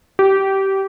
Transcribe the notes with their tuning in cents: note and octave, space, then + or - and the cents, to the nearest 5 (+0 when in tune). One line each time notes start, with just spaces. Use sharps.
G4 -20